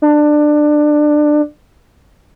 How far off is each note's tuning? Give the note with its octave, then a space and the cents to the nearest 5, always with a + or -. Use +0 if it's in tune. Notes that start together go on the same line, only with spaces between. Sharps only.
D4 +20